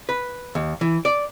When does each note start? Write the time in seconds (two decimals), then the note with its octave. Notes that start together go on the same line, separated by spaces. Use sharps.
0.09 B4
0.55 D#2
0.81 E3
1.05 D5